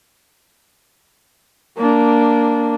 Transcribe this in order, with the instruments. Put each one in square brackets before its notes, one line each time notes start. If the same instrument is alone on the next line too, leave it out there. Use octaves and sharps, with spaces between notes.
[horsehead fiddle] A#3 D4